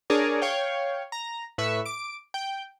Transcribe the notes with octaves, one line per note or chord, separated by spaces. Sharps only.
D4 G#4 A#4 C#5 D5
C#5 F5 G5
A#5
A2 B4 E5 C#6
D6 D7
G5